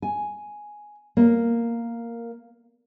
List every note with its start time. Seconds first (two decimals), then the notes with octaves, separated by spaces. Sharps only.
0.02 G#5
1.17 A#3